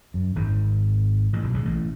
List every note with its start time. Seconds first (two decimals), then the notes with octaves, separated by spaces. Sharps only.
0.14 F#2
0.36 G#1 G#2
1.33 A1 A2
1.44 B1 B2
1.54 C#2 C#3
1.65 A1 A2